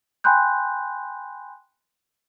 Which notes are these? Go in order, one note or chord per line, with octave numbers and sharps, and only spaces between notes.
G5 G#5 B5 C6 F#6 G6